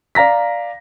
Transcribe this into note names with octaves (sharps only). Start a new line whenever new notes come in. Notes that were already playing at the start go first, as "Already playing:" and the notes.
D5 F5 A#5 A#6 B6